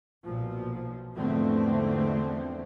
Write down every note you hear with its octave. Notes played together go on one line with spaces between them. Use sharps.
B1 A#2 F3
E2 G#2 D3 F3 A3 C4